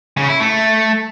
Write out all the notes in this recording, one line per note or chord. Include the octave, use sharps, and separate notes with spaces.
C#3
E4
A3